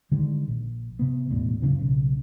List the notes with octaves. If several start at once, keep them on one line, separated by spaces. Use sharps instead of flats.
D3 D#3 G3 G#3
A#1
C3 B3
E1 A1 E2
F#2 C#3 E3
B1 C#3